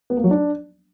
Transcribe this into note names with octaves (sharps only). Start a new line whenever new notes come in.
B3
A#3
F#3
D4